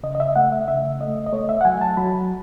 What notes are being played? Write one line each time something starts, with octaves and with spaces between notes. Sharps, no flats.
C#3 D#5
D#5
E5
A3 F#5
E5
C#3 E5
A3 D#5
D#5
A3 C#5
E5
F#5
F#3 G#5
A5
F#3 B5